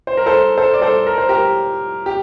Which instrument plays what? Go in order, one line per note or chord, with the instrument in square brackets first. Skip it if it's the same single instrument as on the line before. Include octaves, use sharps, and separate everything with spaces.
[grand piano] C5
A#4
A4 C5
A4 C5
D5
A4 C5
A#4
C5
G4 A#4
G4